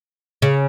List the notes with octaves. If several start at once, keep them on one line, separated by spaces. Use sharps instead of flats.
C#3